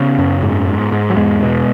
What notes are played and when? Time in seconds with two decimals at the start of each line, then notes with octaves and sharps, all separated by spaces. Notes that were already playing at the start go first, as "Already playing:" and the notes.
Already playing: C#3 B3
0.18 F#2
0.43 G#2
0.67 G#2
0.92 G#2
1.10 F#3
1.17 E2 G#3
1.43 B2